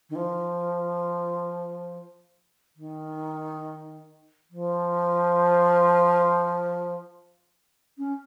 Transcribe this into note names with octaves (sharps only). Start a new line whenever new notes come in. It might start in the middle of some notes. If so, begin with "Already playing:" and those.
D#3
F3
D#3
F3
C#4